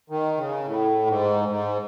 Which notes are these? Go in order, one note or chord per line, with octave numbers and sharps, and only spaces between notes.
D#3
C#3
A2
G#2
G#2